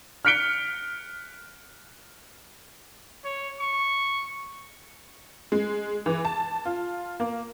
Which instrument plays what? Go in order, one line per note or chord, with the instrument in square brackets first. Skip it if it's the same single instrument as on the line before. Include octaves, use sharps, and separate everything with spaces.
[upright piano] F6 F#6 B6 C#7 D7 G7
[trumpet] C#5
C#6
[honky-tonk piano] G#3
E3
A5
F4
A#3